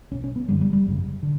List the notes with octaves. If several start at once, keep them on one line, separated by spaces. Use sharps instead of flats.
B1 B2 C#4
C#4
B3
G1 F#2 D3 G3
G3
G3
G1 F#2 C#3
D3